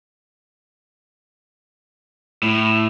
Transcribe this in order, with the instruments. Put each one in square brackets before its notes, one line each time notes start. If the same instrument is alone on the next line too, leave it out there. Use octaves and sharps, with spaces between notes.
[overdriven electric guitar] A2